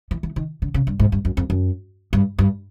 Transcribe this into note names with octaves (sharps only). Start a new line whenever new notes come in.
E3
E3
D#3
D3
C#3
G2
G#2
G2
F#2
F2
F#2
G2
G2